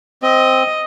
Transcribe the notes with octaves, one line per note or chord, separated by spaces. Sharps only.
C4 D#5